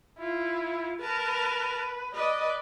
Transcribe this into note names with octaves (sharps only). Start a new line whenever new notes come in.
E4 F4
A#4 B4 A5
B4 D5 D#5